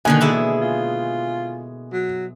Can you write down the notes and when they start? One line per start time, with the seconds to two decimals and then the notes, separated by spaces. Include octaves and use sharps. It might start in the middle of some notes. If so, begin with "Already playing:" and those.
0.05 B2 D3 D#3 A#3 G#5
0.21 E3 G#3 E4 A5
0.61 F4
1.93 F#3